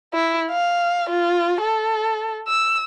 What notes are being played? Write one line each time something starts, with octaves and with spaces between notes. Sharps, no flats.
E4
F5
F4
A4
E6